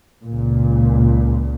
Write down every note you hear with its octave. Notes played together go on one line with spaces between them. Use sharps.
C#2 A#2